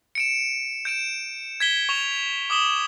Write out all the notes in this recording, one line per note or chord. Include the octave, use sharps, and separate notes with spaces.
C#7 D7 E7
G6 D7 E7
G#6 B6 G7
C#6 F7
D6 D#6 E7 G7